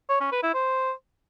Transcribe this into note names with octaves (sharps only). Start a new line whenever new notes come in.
C#5
C#4
B4
E4
C5